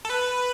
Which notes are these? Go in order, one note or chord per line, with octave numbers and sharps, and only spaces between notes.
A4
B4